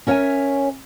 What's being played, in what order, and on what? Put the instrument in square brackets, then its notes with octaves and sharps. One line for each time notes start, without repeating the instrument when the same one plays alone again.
[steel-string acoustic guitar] C#4 A#4 C#5 D#5 E5 G#5